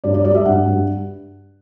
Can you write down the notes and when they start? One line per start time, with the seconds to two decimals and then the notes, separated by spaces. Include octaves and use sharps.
0.04 G2 D5
0.14 D5
0.25 G3 D5
0.35 E5
0.45 G2 F#5
0.66 G2